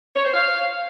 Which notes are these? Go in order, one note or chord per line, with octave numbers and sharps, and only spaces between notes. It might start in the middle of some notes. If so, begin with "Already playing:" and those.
C#5
C5
F5